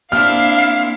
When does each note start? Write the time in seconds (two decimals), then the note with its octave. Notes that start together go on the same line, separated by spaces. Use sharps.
0.12 A#3 C4 D4 E4 F5 F6